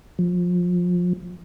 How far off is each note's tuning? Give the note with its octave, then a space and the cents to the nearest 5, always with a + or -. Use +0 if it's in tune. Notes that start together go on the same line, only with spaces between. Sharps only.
F3 +25